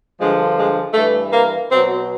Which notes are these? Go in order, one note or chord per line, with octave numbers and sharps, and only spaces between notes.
G2 D3 F3 G#3
G#3
G2 E3 A3
A#3
B2 F#3 C4